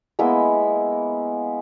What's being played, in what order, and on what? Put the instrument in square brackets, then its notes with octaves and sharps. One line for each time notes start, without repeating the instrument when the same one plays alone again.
[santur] G#3 A#3 B3 E4